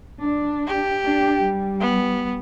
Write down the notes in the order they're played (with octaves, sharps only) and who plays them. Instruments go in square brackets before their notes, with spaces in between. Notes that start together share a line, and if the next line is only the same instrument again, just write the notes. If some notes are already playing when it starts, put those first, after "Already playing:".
[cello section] D4
[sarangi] G4
[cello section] D4
G3
[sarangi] B3